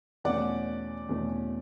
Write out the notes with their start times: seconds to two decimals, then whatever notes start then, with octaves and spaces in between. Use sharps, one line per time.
0.24 E2 B2 A3 C#4 D5 F#5
1.09 E2 B2 A3 C#4